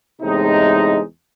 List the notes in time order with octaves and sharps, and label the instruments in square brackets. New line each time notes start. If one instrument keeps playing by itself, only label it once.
[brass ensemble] E2 A2 C3 G#3 D#4